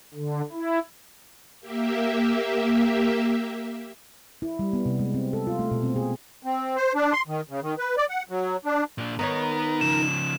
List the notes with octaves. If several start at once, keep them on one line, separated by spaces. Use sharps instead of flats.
D3
E4
A#3 G4 E5
E4
G3
B3
C3
G#3
C4
A4
F4
A3
B2
C4
G#4
C4
C5
D4
C6
D#3
C#3
D#3
B4
D5
F#5
F#3
D4
A#2 D4
D#3 B3 D#4 A#4 C#5
C#3 F3 E7